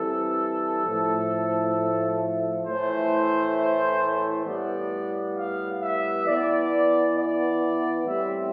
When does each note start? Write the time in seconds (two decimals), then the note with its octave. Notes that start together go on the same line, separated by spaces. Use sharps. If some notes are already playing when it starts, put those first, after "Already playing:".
Already playing: E3 G3 C4 A4
0.85 A2 F3 A3
2.65 A2 E3 A3 C5
4.45 A2 G3 B3 D5
5.35 F5
5.81 E5
6.25 E3 B3 D5
7.15 D5
8.06 A2 G3 C4 E5